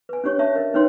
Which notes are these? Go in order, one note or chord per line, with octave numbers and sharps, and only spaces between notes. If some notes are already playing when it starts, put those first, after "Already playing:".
B4 G#5
C#4 D4 G4 C#5 C#6
C#4 C#5 E5 A5
A#4 D#5
C#4 D#4 B4 C#5 G5 C6